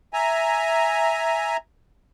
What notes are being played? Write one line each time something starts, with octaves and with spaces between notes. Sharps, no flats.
E5 G#5 A#5